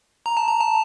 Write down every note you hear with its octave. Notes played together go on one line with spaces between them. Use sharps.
A#5
A5
A#5
A5